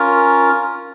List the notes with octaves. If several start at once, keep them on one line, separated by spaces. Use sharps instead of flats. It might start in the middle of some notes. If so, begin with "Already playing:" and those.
Already playing: C#4 F4 A#4